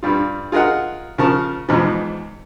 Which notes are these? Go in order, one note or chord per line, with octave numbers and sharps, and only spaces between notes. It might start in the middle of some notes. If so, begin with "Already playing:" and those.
G2 G3 F4
F4 G#4 A#4 D#5 F#5
C#3 F3 A#4 A5 C#6
E2 G#2 B2 F3